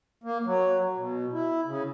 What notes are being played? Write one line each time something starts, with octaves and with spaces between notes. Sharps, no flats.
A#3
F#3
B2
E4
C#3